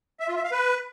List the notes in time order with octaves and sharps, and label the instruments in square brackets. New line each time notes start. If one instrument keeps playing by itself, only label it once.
[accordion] E5
F4
E5
F5
B4